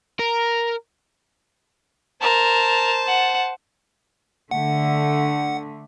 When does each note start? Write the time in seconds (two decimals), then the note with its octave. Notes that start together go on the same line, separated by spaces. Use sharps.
0.19 A#4
2.22 A#4 C5 A5
3.07 F#5
4.51 D3 A3 F#5